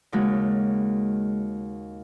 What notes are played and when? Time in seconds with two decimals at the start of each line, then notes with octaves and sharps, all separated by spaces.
0.12 D#2 C#3 G#3 F#4